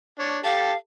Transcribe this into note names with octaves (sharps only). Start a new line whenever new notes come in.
D4 C#5
G4 A4 F5 A5